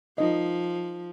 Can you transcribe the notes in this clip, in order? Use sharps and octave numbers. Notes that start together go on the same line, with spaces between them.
F3 D#4 D#5